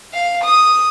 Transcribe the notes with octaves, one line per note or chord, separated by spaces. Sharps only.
F5
D#6